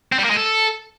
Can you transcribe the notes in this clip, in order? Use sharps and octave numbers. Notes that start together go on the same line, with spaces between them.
C4
G3
A#3
G#3
A4